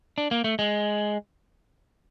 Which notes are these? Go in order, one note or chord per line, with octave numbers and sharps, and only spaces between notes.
D4
A#3
A3
G#3